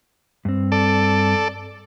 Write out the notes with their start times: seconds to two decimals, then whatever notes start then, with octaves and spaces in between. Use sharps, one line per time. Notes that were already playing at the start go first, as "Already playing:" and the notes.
0.45 G2 C4
0.72 A4 D5